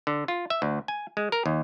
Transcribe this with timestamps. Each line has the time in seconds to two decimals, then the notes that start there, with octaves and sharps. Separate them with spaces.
0.07 D3
0.28 F4
0.50 E5
0.62 D2
0.88 G#5
1.17 G#3
1.32 A#4
1.46 D#2